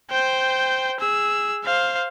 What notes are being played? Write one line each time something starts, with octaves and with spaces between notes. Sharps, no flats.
C5 G5
G#4 E6
C5 F5